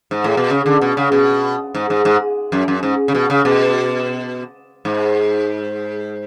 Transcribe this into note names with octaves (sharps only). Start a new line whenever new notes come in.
G#2
A2
B2
C#3
D3
B2
C#3
B2
G#2
G#2
G#2
F#2
F#2
G#2
C#3
B2
C#3
B2
G#2